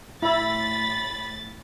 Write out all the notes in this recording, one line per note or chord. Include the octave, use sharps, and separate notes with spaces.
A2 E4 E5 B5 A6